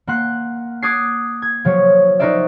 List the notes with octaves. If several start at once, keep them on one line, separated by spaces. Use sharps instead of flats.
A#3 F#5 C6 F#6
D6 D#6 F#6 G#6 A6 C7
G#6
F3 F#3 F4 C#5
D#4 F#4 A#4 C5 D5 E5